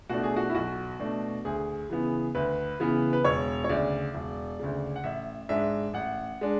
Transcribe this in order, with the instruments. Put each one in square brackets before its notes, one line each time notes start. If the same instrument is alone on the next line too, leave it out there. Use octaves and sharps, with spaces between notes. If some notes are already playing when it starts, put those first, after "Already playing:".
[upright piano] B2 A3 D4 F#4
G#4
F#4
E4
B1 F#4
B2 A3 D4
D2 G#4
C#3 E3 B3
D2 B4
C#3 E3 B3
B4
E1 C#5
C#5
D2 C#3 D5
E1
D2 C#3
F#5
A1 E5
G#2 G#3 D4 E5
A1 F#5
G#3 D4